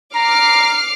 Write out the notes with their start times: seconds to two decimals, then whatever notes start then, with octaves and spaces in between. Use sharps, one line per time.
0.15 A#5 D6 F6 C7